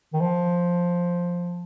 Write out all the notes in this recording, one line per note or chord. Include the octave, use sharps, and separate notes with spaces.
D#3
F3